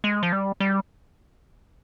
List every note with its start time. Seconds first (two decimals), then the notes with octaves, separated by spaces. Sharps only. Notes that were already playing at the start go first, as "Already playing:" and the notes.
0.04 G#3
0.23 F3
0.33 G3
0.60 G3